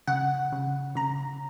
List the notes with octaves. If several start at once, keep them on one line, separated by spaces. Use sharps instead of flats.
C#3 F#5
C#3
C#3 A#5